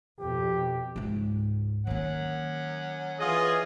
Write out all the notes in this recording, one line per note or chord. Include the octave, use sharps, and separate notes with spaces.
F2 B2 G4
C#2 G#2
D#3 A#3 C#4 F#5
E3 F4 G#4 D#5